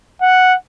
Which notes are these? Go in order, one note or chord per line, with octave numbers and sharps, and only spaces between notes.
F#5